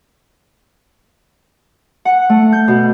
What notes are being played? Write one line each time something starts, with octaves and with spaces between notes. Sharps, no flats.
F#5
A3
G6
B2